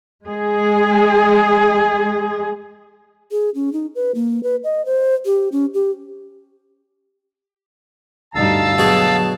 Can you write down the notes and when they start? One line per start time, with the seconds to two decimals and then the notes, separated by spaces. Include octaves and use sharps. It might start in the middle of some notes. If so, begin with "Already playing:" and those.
0.24 G#3 G#4
3.32 G#4
3.55 C#4
3.73 D#4
3.95 B4
4.15 A#3
4.43 B4
4.64 D#5
4.86 C5
5.25 G4
5.52 C#4
5.74 G4
8.35 D2 G2 D#4 F5 A5 E6 A6
8.79 B2 F#3 G#4